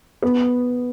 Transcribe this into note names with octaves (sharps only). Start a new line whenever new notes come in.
B3